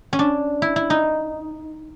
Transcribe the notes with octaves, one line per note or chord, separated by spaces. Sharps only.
C#4
D4
E4
E4
D#4